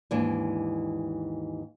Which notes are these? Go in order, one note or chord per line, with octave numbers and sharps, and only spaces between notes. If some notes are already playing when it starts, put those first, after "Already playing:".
D#2 G#2 E3 D4